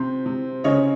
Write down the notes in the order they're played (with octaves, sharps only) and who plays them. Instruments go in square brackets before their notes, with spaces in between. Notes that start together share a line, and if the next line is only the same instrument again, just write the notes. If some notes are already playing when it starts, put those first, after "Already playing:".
Already playing: [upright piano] C3 C5
C3
C#3 C#5 D#5